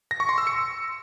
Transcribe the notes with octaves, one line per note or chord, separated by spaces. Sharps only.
A#6
C#6
C6
E6
C#7